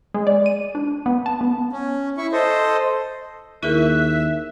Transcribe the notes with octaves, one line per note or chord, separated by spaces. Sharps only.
G#3
D5
D#7
D4
B3
A5
B3
C#4
E4 C#6
A4 C5 D#5
D#2 E4 G#4 A#4 E5 F#6